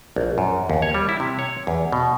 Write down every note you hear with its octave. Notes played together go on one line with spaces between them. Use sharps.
A#1
F#2
D#2
C#5
G3
E4
C3
C#5
E2
B2